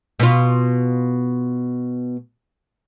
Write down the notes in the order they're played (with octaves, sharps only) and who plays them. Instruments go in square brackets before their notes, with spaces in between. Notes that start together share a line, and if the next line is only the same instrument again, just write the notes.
[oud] B2 F4